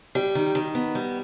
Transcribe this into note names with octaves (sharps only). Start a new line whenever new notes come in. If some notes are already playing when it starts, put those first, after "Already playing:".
G3
D#3
D#3
B3
G3